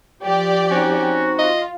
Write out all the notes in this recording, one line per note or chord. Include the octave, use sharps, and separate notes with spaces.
F3 G4 D5
C4 C#4 D#4 F#4
F4 D#5